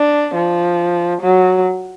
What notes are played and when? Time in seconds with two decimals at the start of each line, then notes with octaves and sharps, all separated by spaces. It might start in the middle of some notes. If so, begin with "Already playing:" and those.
Already playing: D4
0.35 F3
1.22 F#3